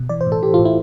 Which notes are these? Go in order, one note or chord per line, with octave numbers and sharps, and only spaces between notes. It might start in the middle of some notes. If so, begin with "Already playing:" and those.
Already playing: B2
E3 D5
C5
A2
A4
E3 G4
F4
A2
E4